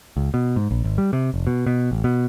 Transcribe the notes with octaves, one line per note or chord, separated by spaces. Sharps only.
C#2
B2
G#2
A#1
G#1
G3
C3
F1
B2
B2
A1
B2